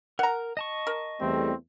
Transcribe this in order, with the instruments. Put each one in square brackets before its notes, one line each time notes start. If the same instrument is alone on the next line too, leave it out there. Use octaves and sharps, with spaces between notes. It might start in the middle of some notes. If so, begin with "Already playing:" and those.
[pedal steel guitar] A#4 [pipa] F#5 A#5
[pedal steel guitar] D#5 A5 C#6
[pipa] A#4
[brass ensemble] E2 G3 A3 [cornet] C4